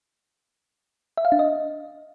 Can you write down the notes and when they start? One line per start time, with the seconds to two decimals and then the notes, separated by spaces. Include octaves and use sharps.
1.17 E5
1.25 F5
1.32 D4
1.39 D#5